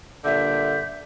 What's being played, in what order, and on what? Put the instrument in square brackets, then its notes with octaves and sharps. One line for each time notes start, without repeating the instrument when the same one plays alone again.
[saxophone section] G2 A#2 D3 [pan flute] E5 [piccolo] G6